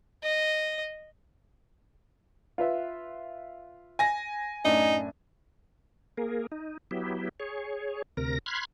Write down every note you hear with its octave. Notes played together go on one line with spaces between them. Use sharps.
D#5
F4 B4 E5
G#5 A#6
F#2 A2 D4 D#4
A#3 G#4 A#4
D#4
F#3 B3 E4 G4
G#4 C#5
D2 C3 A#4 A#6
B5 C6 F6 F#6 G#6